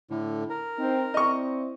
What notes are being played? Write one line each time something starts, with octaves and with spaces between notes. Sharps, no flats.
A2 D3
A#4
C4 D#4
C4 E4 D5 D#5 C#6